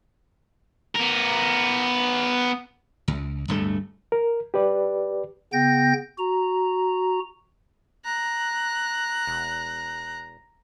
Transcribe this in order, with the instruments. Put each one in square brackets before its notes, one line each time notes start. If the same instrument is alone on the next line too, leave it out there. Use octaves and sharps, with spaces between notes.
[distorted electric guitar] B3 A#4
[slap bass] C#2
D1 G2 A3
[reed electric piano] A#4
G4 B4 D5
[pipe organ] C#3 B3 G5 G6 A#6
F#4 A#5
[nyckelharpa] A#5 [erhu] F#6
[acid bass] E1